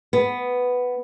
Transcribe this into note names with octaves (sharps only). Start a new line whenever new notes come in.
B3